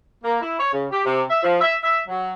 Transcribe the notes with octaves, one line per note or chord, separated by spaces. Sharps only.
A#3
E4
C#5
C#3
G4
C3
E5
F3
E5
E5
F#3